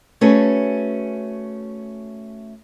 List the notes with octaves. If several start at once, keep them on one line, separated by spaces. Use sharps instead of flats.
A3 C#4 F#4 G#4 A4 B4